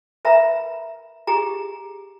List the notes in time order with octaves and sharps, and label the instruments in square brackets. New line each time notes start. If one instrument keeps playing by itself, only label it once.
[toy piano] A#4 B4 E5 A#5 B5
G4 G#4 A#5